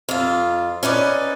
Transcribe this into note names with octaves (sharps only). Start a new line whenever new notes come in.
F2 F4
C#4 D#4 B4 D5